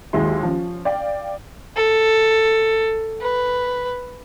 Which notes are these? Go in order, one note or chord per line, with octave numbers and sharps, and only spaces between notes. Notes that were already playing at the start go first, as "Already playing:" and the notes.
D#2 F#3 G#3 E4 C6
F3 C#4
D5 F5 G5
A4
B4